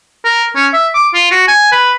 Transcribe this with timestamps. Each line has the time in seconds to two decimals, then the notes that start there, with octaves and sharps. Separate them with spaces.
0.25 A#4
0.56 C#4
0.73 E5
0.95 D6
1.14 F4
1.31 F#4
1.48 G#5
1.72 B4